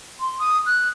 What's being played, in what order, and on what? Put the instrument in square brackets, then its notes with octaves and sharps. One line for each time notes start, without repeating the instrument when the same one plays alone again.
[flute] C6
D#6
F#6